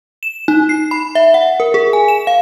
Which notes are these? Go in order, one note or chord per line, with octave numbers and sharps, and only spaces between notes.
E7
D#4
C7
B5
E5
F#5
A#4
G#4
G#5
E7
F5